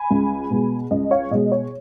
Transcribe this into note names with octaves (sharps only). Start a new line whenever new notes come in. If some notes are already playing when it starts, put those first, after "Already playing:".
Already playing: G#5 B5
C#2
B2 G#3
C#2 D#5
C#5 F5
B2 G#3 D#5
C#5